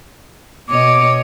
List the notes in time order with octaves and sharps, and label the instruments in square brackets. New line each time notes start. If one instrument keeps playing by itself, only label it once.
[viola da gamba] B2 C#5 D#5 [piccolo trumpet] D6